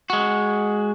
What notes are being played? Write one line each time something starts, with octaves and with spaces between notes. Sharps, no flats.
G#3 F#4